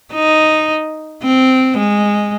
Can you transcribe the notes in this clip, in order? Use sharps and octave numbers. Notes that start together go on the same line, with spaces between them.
D#4
C4
G#3